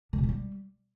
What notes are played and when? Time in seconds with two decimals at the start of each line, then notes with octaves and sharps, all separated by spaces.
0.13 D3
0.18 B2
0.23 A3
0.29 G3